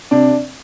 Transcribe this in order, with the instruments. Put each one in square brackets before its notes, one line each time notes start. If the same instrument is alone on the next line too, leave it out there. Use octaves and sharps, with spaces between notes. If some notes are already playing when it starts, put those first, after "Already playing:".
[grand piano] C3 D4